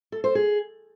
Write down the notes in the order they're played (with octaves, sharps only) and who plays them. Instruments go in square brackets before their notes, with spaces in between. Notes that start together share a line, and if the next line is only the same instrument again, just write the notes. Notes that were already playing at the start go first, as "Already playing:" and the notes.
[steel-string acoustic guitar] A4
C5
G#4